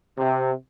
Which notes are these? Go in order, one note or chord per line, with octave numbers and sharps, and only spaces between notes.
C3